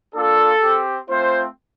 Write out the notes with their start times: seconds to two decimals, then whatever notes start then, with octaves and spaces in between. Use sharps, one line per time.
0.14 A#3 D4 F4 A4
0.61 C4 G4
1.08 A3 C4 F4 C5